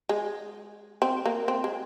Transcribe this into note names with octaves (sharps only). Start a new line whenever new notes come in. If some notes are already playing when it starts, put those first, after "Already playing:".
G#3
C4
A#3
C4
G#3